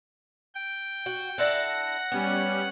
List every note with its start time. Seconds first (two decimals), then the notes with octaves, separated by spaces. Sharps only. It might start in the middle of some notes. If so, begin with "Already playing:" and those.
0.55 G5
1.06 F#4
1.38 D4 E4 A4 F#5 A#6
2.12 G3 B3 C#4